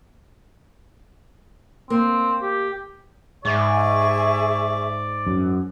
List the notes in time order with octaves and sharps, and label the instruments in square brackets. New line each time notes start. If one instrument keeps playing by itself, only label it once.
[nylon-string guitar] A#3 [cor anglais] C4
[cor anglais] G4
[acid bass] G#2 [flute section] G#4 E5 C#6 [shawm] D5
[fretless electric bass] F#2